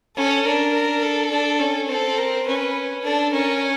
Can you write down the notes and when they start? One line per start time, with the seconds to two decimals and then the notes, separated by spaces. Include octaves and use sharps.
0.16 C#4 A4
0.45 D4 A#4
0.74 A#4
1.03 A4
1.31 D4
1.60 C#4
1.89 C4 A4
2.18 A#4
2.47 C#4 B4
3.04 D4 A4
3.33 C#4 A#4